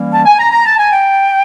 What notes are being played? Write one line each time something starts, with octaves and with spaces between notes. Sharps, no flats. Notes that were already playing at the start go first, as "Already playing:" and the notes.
Already playing: E3 G3 A#3 C#4
A5
G#5
A#5
A#5
A5
G#5
G5